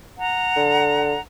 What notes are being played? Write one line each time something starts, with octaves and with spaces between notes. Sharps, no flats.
F#5 A#5
D3